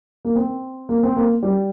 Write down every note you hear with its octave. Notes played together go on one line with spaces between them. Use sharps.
A#3
C4
A#3
C4
A#3
G3